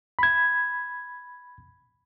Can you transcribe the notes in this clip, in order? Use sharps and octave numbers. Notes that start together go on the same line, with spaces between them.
B5 G#6